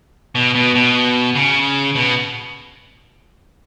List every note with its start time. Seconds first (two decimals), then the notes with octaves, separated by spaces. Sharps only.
0.35 B2
0.55 B2
0.75 B2
1.36 C#3
1.95 B2